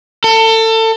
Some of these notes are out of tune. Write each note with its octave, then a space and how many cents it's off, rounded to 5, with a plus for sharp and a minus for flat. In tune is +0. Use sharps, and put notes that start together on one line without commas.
A4 +30